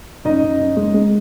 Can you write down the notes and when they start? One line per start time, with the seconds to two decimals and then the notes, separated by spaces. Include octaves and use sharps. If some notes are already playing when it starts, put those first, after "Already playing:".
0.25 F#2 D#4 D#5
0.43 F#2
0.60 F#2
0.77 G#3
0.94 G#3